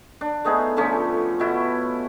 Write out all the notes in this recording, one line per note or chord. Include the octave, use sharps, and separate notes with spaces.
D4
A3 B3 D#4 G#4
D3 F3 A3 C#4
B2 E4 F#4